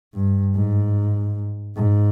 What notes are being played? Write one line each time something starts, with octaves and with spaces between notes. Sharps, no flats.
G2
G#2
G#2